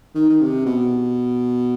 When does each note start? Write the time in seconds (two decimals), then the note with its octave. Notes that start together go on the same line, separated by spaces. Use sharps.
0.15 D#3
0.30 D#3
0.41 C3
0.66 B2